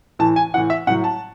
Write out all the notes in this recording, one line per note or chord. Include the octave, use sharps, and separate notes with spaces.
A2 E3 A5
G#5
A2 E3 F#5
E5
A2 F#3 F#5
A5